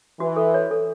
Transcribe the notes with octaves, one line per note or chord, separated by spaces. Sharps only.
E3 F#4
A4
C#5
A4